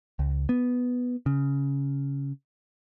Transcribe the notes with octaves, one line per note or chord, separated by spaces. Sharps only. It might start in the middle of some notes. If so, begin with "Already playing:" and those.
C#2
B3
C#3